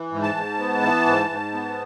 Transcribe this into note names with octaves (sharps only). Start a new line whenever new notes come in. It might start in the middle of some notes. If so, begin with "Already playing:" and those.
Already playing: E3
G#2
A5
G#2
B3
E3
G#2
G#2
B3